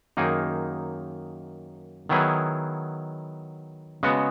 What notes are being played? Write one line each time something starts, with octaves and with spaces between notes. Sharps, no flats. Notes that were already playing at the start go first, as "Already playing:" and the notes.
F#2 D#3 A#3 D#4 G#4
D#3 F#3 B3 E4 G#4
C#3 G#3 B3 F#4